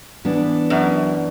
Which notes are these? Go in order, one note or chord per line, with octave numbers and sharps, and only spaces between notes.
E3 B3 D4
F#2